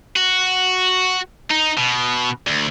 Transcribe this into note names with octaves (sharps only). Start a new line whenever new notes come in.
F#4
D#4
B2
D2